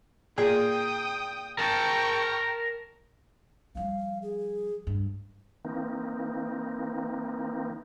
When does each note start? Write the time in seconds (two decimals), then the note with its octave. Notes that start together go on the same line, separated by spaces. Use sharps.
0.38 A#2 G#4 G5 D#6
1.59 A#4 G5 A5 C#6
3.75 F3 G3 F5
4.22 G#4
4.87 G2
5.65 E3 A#3 C4 D#4